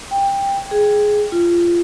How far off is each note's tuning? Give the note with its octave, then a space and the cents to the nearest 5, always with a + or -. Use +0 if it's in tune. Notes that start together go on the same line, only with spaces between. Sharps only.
G5 +15
G#4 +5
F4 -20